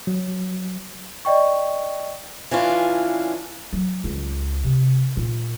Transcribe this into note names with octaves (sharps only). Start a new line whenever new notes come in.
F#3
D5 D#5 G5 C#6
E3 C#4 D4 F4
F#3
C#2
C3
A#2